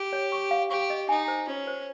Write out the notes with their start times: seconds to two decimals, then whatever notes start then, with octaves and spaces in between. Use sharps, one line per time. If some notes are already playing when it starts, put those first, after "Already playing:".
Already playing: G4
0.13 C#5
0.32 C#6
0.51 F5
0.71 G4 C#6
0.90 D#5
1.09 D#4 G#5
1.28 C5
1.47 C#4 F4
1.67 C5